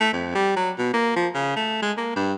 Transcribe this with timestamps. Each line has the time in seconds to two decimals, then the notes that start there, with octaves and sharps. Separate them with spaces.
0.01 A3
0.13 F2
0.35 G3
0.56 F#3
0.78 B2
0.94 A#3
1.16 F3
1.34 C#3
1.56 A3
1.82 G#3
1.97 A#3
2.16 G2